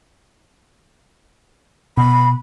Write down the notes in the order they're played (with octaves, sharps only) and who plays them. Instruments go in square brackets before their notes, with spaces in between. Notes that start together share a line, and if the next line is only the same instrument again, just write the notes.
[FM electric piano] B2 [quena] B5